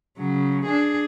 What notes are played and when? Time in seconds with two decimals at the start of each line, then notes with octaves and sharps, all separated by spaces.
0.19 C#3 F#3
0.66 D4 G#4